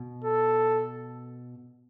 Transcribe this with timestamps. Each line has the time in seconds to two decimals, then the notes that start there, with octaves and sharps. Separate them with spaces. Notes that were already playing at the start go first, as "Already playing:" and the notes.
Already playing: B2
0.24 A4